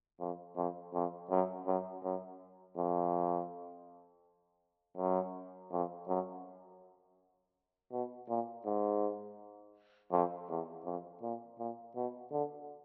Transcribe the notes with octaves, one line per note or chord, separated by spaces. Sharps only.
F2
F2
F2
F#2
F#2
F#2
F2
F#2
F2
F#2
B2
A#2
G#2
F2
E2
F2
A#2
A#2
B2
D3